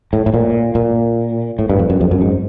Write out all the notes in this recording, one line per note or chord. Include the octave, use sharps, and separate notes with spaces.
A2
A2
A#2
A#2
A2
G2
F2
F#2
F2
F#2
G#2